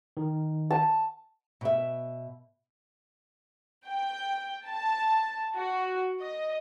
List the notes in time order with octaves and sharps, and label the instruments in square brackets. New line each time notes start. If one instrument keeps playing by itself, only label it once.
[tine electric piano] D#3
[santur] A5
[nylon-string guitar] B2 E5
[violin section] G5
A5
F#4
D#5